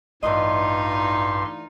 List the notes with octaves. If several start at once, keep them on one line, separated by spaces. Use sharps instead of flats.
A1 D2 G2 E3 D#4 F4 D#5 C6